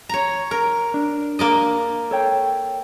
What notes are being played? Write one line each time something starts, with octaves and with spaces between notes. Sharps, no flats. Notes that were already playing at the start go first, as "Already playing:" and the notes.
C#5 A#5
A#4
D4
A#3 D5 D#5
A4 C#5 G5